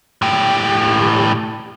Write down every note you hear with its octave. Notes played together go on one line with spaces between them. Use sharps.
A2 G4